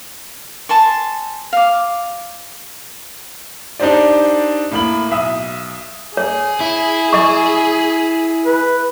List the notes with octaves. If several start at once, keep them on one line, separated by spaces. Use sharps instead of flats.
G#5 A5 C6 C#6
F5 D6
D4 D#4 G4 C5 D5
A2 A#3 B5 F#7
B1 E5 D#6
G#4 C#5
E4
D#5 C#6
B4